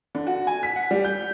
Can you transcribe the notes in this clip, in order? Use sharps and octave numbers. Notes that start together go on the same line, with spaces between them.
D3
F#4
G#5
B6
F#5
G3
G6